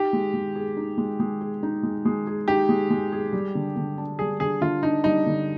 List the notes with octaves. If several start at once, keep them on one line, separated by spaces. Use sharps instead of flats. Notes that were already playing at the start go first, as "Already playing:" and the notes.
Already playing: D#4 G4
G#3
G#3
G#4
D#4
G#3
G#3
G#4
D#4
G#3
G#3
G#4
D#4 G4
G#3
G#3
G#4
G3
D3
D3
D4
G3 G#4
D3 G#4
D3 F4
D4 D#4
G3 D#4
D3